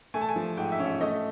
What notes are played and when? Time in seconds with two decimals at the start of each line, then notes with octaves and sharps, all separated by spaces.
0.14 A3 G#5
0.21 A5
0.29 G#5
0.36 F3
0.57 G#2 G5
0.72 E5
0.79 C#4
0.86 E5
1.01 A3 D#5